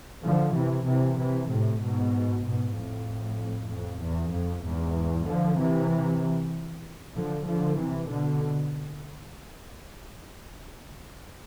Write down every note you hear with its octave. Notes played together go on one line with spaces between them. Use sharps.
D3 F3
C3 E3
C3 E3
C3 E3
A2 C3
G#2 B2
G#2 B2
F2 A2
F2
E2
F2
E2 G#2
D3 F3
C3 E3
D3 F3
D3 F3
C3 E3
B2 D3